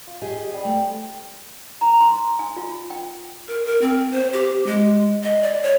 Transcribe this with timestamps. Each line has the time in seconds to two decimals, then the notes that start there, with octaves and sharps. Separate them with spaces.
0.07 F4
0.22 G4 G#4 D#5
0.51 G3 C4
0.65 A3 G#5 D#6
1.81 A#5
2.00 C6
2.39 G#5
2.57 F4
2.90 G5
3.48 A#4
3.65 A#4
3.81 C4
4.12 C5
4.33 G4
4.66 G#3
5.23 D#5
5.42 D5
5.63 C#5